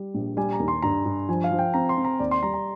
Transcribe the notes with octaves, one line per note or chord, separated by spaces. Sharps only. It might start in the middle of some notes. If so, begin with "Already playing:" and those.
Already playing: G3
A#1
G3 G#5
A#5
D#2
C6
G2 A#5
G2
F3 G#5
F5
F3
G5
C4 A#5
C6
C4
A#5
D#2 D5
C6
G3 A#5
A#5